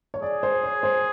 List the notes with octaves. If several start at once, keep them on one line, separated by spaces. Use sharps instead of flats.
C#5
G#4 D5
C5
C#5
C5